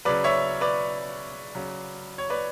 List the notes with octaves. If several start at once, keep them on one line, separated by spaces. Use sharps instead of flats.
C#3 F#3 B4 D5
C#5 E5
B4 D5
C#3 F#3
C#5
B4 D5